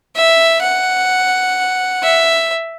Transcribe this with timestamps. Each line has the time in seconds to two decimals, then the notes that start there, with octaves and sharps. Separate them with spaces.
0.16 E5
0.62 F#5
2.03 E5